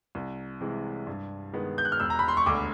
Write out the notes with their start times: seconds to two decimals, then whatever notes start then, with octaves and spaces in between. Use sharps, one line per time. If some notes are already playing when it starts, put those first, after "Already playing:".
0.15 C2
0.61 C3 E3 G#3
1.07 G2
1.53 D#3 G#3 B3
1.78 G6
1.85 F#6
1.92 F6
2.00 E1 E6
2.10 A#5
2.19 B5
2.28 C6
2.37 C#6
2.46 D2 D3 D6